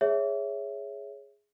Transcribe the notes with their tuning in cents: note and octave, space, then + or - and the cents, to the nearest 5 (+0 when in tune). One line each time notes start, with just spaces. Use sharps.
G#4 +0 C#5 +0 E5 +0